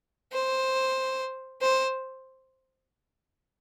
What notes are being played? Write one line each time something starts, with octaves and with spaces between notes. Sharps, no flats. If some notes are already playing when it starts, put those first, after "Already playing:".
C5
C5